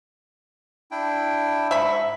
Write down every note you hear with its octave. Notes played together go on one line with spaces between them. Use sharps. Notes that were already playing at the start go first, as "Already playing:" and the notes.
D4 E4 G5
G#2 E5 B5 C#6